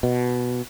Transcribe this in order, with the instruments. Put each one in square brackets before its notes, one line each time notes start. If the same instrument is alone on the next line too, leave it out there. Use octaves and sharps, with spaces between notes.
[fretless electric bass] B2